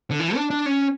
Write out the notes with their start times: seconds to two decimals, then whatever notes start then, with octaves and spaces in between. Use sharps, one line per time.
0.11 D3
0.20 E3
0.35 D4
0.50 D4
0.66 C#4